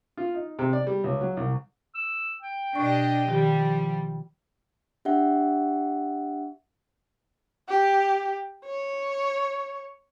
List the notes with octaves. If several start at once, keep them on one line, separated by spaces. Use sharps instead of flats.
F4
D#4
C3
D5
G3
C#2
F#3
C2
E6
G5
B2 D4 G4 D#5 C#6
D#3 F3 G3 G4
D4 G4 E5 F#5
G4
C#5